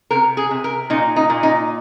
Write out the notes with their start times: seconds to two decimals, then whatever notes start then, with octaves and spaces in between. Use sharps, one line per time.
0.11 C3 A#4
0.37 G#4
0.51 C3
0.64 A#4
0.90 A#2 D#4
1.16 D#4
1.30 A#2
1.43 D#4